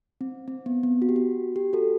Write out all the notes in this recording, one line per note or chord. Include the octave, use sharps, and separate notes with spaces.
C4
C4
B3
B3
F#4
G4
F#4
G4
F#4 A4